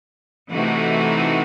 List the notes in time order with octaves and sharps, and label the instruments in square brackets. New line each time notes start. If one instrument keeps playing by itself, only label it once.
[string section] C3 E3 A3 D#4 F#4